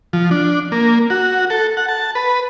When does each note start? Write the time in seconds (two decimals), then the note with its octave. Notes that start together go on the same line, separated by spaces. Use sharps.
0.13 F3
0.31 D4
0.72 A#3
1.10 F#4
1.50 A4
1.77 F#5
1.88 A5
2.15 B4